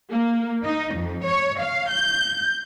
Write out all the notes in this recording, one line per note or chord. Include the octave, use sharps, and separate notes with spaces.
A#3
D#4
F2
C#5
F5
G6